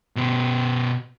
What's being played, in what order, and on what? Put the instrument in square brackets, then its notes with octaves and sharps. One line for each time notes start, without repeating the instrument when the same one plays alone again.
[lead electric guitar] B2 C5